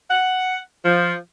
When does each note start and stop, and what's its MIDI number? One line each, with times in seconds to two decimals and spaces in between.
0.09 0.57 78
0.84 1.13 53